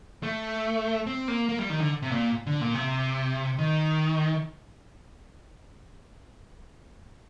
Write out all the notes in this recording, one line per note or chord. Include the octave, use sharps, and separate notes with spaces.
A3
C4
A#3
A#3
G3
D#3
D3
C3
A#2
D3
A#2
C3
D#3